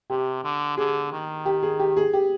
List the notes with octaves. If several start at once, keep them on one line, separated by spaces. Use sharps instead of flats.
C3 G4
D3
D3 G#4
D#3
G4
G#4
G4
G#4
G4